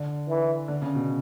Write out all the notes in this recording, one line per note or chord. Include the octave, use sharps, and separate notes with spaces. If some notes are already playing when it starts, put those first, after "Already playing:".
Already playing: D3
E3
D3
C#3
B2